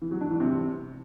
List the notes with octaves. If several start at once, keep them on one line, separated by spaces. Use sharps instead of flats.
E3
F#3
D4
E3
C3